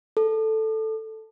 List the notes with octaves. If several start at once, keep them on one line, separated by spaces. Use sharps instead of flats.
A4